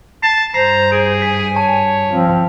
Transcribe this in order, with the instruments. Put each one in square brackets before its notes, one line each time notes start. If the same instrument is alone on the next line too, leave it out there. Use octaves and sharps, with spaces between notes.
[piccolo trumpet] A5 [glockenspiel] C7
[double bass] G2 [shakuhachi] C5 [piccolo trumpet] A#5 [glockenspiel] C7
[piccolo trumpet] G#4 [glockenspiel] D7
[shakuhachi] G#5 [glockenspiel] B6
[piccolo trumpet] C#5 [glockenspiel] A5
[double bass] F3 [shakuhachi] C4